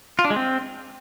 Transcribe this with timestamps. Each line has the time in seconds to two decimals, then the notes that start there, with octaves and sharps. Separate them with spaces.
0.19 F4
0.25 D4
0.30 G#3
0.36 C4